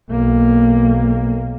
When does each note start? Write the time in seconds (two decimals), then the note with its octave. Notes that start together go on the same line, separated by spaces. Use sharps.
0.10 B1 A#3